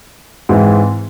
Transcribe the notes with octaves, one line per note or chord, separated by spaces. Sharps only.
G#2 E3 G#3 C4